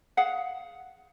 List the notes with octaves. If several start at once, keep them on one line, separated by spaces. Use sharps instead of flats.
G#4 F5 F#5